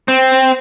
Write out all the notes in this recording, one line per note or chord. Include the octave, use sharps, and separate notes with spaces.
C4